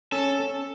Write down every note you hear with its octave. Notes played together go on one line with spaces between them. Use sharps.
C#4 A4